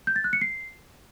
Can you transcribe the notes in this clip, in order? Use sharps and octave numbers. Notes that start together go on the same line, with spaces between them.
G6
A6
F#6
C#7
C7